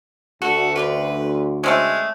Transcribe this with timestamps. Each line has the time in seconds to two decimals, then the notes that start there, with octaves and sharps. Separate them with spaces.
0.42 D2 F#4 A4
0.76 C#4 B4 D5 C6
1.64 G#3 A3 C4 C#4 D5